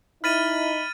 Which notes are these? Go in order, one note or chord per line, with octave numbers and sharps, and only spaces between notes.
D#4 E4 B5 F6 A6 D#7